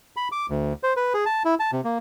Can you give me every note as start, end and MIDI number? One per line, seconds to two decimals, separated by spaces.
0.17 0.28 83
0.32 0.46 86
0.50 0.73 38
0.83 0.94 72
0.96 1.13 71
1.14 1.24 68
1.26 1.43 81
1.45 1.55 64
1.60 1.71 81
1.72 1.81 48
1.84 1.98 58